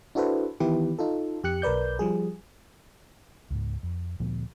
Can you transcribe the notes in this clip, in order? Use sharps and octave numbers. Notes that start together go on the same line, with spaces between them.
D4 E4 F#4 A4 B4 C5
D#3 E3 B3 E4 G4 B4
D#4 F4 A4
F2 G4 F#6 C#7
B1 A#4 B4 D5 G6
F3 G3 G#4
C#2 G#2
F2
D2 A#2 F3 B3